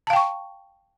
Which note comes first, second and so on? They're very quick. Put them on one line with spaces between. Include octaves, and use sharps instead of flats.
A5 F5 G5 C#6